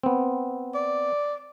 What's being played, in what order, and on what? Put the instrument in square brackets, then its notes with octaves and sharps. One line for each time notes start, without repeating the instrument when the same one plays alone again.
[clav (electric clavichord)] B3 C4
[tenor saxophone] D5